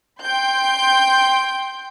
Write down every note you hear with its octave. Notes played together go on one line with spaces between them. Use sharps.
G5 C6 G6